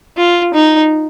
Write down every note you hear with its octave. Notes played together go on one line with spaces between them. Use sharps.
F4
D#4